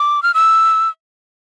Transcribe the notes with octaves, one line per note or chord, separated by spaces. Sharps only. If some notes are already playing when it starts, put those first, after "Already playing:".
Already playing: D6
F6
E6